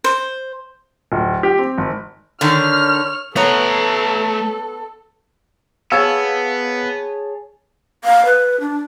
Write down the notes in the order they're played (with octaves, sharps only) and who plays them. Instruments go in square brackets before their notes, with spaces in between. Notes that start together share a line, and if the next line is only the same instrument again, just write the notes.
[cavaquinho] C5
[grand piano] D1
G4
C4
G#1
[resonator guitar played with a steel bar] D3 D#3 [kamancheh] C#5 F6
[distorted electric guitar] A3 A#5 [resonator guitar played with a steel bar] B3 C#5 [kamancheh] A4
[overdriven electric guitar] B3 [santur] G#4 C#5 A5 [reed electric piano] F5 E6
[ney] F5
B4
D4